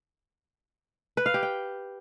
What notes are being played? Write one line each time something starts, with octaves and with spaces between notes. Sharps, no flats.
B4
F5
G4
G5